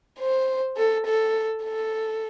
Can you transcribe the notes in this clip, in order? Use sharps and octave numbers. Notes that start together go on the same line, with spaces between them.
C5
A4
A4
A4